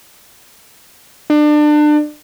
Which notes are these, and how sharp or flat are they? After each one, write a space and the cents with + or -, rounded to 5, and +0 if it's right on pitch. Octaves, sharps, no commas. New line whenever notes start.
D4 +30